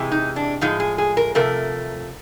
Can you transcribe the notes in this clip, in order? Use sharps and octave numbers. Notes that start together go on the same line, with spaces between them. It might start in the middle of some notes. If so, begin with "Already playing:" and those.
Already playing: C3 E3 G#3
D#4
D4
A2 F3 G#3 D#4
G#4
G#4
A#4
C3 F3 A3 A#4